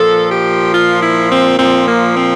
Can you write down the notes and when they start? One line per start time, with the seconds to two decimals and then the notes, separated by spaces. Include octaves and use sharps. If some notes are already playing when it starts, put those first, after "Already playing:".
Already playing: A#2 F3 A4
0.31 G4
0.74 F4
1.03 E4
1.31 C4
1.58 A#2 F3 C4
1.87 A#3
2.16 C4